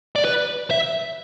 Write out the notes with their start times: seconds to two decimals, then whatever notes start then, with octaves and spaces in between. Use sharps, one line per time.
0.16 D5
0.25 B4
0.71 E5